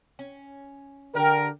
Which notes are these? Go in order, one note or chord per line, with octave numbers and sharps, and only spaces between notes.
C#4
D3 G4 A#4 D5 G5